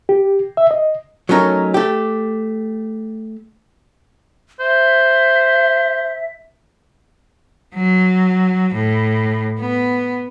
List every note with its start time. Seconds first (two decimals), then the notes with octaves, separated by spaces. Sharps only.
0.09 G4
0.57 E5
0.71 D#5
1.29 F#3 A3 C#4 D#4 A#4
1.74 A3 G4
4.60 C5 E5
7.75 F#3
8.75 A2
9.60 B3